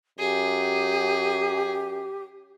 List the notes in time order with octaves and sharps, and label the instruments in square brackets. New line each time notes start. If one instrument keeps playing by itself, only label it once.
[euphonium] F#2 [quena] G4 [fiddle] G#4